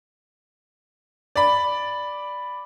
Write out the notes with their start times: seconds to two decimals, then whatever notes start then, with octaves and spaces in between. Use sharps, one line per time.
1.36 D5 B5